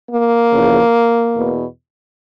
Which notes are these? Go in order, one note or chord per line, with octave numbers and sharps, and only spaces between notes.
A#3
E2 C#3 F3
E2 B2